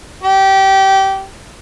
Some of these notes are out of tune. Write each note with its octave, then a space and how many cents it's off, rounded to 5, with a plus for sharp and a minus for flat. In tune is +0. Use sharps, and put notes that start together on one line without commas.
G4 -20